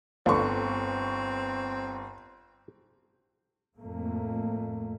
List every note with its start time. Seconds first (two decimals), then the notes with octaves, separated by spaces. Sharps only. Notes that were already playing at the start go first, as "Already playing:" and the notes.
0.26 G1 D3 F3 B3 C4 C#6
3.76 F2 A2 A3 A#3